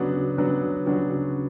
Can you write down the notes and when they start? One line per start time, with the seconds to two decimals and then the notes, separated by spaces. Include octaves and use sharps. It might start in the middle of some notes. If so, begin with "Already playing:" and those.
Already playing: C#3 F#3 B3 D4 F#4
0.13 C#3
0.38 F#3 B3 D4 F#4
0.61 C#3
0.86 F#3 B3 D4 F#4
1.09 C#3